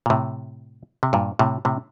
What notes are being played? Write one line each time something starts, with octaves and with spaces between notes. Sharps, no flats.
A#2
A2 C3
C3
G2 A#2
A2 C3
A2 C3